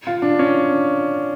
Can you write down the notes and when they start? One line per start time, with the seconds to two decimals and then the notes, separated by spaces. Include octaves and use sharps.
0.07 F4
0.22 D4
0.39 C#4